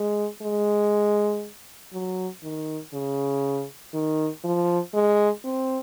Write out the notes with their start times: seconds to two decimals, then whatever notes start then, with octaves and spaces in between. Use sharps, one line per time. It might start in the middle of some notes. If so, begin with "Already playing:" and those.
Already playing: G#3
0.42 G#3
1.92 F#3
2.43 D#3
2.93 C#3
3.93 D#3
4.44 F3
4.94 G#3
5.44 C4